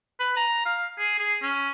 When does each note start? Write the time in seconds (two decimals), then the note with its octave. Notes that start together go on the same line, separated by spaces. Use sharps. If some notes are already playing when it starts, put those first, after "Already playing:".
0.20 B4
0.37 A#5
0.66 F5
0.98 G#4
1.19 G#4
1.42 C#4